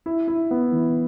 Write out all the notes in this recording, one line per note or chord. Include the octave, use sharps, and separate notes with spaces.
E4
E4
B3
E3